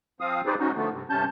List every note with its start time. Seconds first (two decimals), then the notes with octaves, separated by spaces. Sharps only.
0.20 F3 C4 F5 D#6
0.46 D#4 G4 G#4 B4 C5 D5
0.59 G#2 C#4 D#4 F#4
0.76 D3 F3 A3 B3
0.92 G2 C3
1.10 G2 C3 C#4 A5 G6